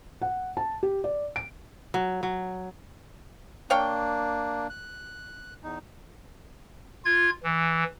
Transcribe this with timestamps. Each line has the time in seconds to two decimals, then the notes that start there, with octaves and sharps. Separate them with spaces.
0.22 F#5
0.57 A5
0.83 G4
1.04 D5
1.36 D7
1.94 F#3
2.23 F#3
3.70 A#3 D4 C#5 F5 G5
4.70 F#6
5.63 E2 D#4
7.05 F4 G#6
7.44 E3